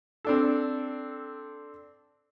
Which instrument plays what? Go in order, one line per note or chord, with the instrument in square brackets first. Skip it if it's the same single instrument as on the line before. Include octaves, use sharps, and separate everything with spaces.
[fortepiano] C4 D4 A4